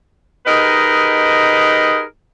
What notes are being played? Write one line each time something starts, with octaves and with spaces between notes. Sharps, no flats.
D#4 G4 G#4 A#4 B4 D#5